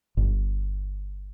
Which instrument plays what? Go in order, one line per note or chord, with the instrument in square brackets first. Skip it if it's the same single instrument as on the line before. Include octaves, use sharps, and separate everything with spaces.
[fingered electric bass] G1